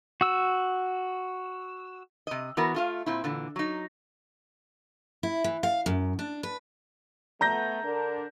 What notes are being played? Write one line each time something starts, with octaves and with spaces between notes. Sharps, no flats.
F#4 E6
C3 D#5
E3 B3 F#4 A#4
A3 F4 F5
A#2 C4 E4
A#2 D3 E3
F#3 D#4
E4
E3
F5
F#2
D4
B4
A3 B3 A#5 G6 A#6
D3 D4 A#4